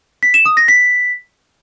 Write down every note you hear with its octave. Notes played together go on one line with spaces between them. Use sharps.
B6
E7
D#6
A#6
B6